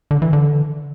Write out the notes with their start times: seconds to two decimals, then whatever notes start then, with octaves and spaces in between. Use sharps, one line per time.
0.11 D3
0.22 E3
0.33 D3